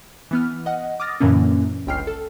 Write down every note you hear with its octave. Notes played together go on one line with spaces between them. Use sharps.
E3 B3 F6
D#5 F#5
D6 D#6 F6 A6 A#6
F#2 A#2 D3 E3 A#3 C#4
G1 C#2 G5 F6 C7
A4